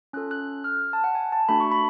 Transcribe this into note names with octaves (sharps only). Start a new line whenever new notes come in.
C#4 F4 A4 F#6
F#6
F6
F#6
A5
F#5
G#5
A5
A3 D4 F#4 A4 B5
C#6
B5